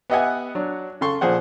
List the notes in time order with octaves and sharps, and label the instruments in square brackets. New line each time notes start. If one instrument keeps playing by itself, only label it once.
[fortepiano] B3 G4 D#5 E5 F#5 G#5
F#3 D4
C#3 A4 C6 C#6
A#2 F3 G#4 C5 F#5